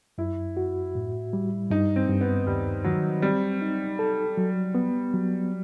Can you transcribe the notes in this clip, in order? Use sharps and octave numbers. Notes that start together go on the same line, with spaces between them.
F#2 E4
F#4
A2
G3
G2 D#4
C4
G2
B3
D#2 G3
D#3 F#3
G3 C4
D#4
A4
F#3
B3
F#3